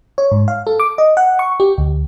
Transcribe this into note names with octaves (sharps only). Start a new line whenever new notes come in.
C#5
G#2
F5
A4
D6
D#5
F#5
C#6
G4
D2